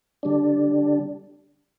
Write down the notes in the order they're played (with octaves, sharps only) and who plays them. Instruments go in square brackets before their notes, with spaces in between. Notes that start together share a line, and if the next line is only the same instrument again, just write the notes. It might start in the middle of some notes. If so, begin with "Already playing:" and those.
[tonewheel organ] D3 G3 D4